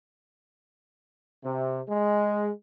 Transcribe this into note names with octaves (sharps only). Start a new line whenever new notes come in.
C3
G#3